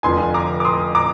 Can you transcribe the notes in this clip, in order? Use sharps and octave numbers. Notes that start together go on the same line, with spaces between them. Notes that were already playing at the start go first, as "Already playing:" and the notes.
F1 F2 D3 F3 G#5 C6
A#5 D6
D6
C6 D#6
A#5 D6